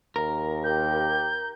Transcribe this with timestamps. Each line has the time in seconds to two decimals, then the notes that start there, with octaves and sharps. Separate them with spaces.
0.16 D#2 A#4
0.64 G4 G6